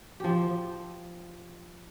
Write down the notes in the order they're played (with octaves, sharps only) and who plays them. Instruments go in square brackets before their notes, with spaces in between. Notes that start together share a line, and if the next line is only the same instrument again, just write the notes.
[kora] F3 G4